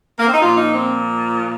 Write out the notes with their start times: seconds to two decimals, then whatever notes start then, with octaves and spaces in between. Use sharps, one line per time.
0.19 A#3
0.27 C4
0.34 D#4
0.42 A#2 F3 F4
0.58 D#4
0.74 C4